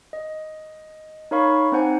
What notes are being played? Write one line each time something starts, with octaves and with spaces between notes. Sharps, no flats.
D#5
D#4 A#4 C#5 F5 B5 C#6
C4 D#4 C5 F#5 G#5